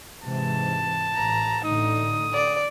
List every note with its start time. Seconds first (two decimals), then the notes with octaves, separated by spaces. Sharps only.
0.24 G#2 C3 E3 A5
1.15 A1 A#5
1.65 A1 A2 D3 D#4 D#6
2.33 D5